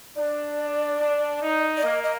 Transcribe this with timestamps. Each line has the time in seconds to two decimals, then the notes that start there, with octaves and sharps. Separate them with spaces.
0.16 D4 D5
1.00 D4
1.42 D#4
1.77 D5
1.83 A#3 D#5
2.03 D#5